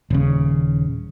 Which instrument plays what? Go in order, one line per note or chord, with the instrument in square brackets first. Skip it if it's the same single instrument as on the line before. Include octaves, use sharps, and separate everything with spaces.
[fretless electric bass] D#1 C#3